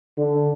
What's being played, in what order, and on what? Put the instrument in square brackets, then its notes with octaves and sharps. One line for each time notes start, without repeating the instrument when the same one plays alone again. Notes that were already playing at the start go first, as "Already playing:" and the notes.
[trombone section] D3